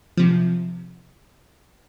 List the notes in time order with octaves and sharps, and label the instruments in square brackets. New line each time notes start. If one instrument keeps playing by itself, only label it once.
[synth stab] C3 F3